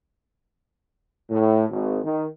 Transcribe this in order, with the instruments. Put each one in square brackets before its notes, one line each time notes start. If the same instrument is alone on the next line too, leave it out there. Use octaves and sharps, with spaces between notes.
[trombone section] A2
G#1
D#3